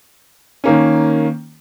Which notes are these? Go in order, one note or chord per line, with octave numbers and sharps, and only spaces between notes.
D#3 A#3 C#4